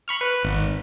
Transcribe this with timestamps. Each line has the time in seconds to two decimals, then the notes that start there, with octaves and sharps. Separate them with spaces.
0.08 B5 C#6 F6
0.21 B4
0.43 G#1